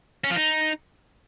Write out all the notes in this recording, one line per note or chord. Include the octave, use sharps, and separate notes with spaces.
C#4
F3
D#4